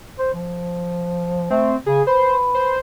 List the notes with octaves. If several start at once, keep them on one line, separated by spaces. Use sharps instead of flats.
C5
F3
A3 C4
C#3 G#4
B4 C5
C5